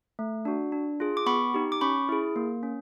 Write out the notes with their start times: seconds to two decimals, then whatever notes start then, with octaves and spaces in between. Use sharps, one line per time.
0.19 A3
0.45 D4 F#4
0.72 D4
1.00 F4 G#4
1.17 D6
1.26 B3 B5 C#6
1.54 D#4 G4
1.72 D6
1.81 C#4 B5 C#6
2.09 E4 G#4
2.36 A#3
2.63 C#4